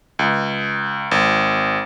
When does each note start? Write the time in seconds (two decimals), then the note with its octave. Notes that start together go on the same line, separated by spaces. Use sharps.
0.19 C#2
1.11 G#1